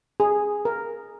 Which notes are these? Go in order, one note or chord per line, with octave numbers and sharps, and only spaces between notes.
G#4
A#4